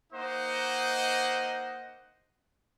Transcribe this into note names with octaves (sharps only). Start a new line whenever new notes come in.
A#3 D#4 C5 D#5 F#5